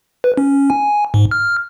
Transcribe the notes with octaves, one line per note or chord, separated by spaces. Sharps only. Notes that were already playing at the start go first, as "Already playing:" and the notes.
B4
C#4
G#5
G#2
F6